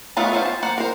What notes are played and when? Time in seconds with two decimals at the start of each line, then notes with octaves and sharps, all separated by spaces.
0.17 D#3 F#3 A3 B3 F4
0.32 B3 C#4 F4 C5
0.45 A5
0.63 A#3 C5 F#5
0.78 A#4 C5